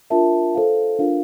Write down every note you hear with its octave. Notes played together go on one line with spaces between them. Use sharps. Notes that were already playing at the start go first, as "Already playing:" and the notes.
D4 F4 A#4 E5 A5
A4 C5 F5
D4 F4 A#4 F5